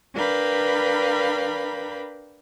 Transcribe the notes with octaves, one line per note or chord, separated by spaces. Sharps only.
D4 A#4 B4 F5 G5 B5